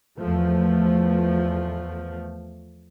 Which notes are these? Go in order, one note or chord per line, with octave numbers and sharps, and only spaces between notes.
E2 F3 A3